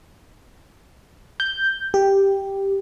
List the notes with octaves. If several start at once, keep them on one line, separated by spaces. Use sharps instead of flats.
G6
G4